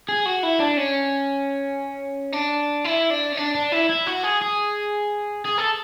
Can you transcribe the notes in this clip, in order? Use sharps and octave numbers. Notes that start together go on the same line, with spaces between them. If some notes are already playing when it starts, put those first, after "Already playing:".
G#4
F#4
E4
D4
C#4
D4
E4
D4
C#4
D4
D4
E4
E4
F#4
G#4
G#4
G#4
A4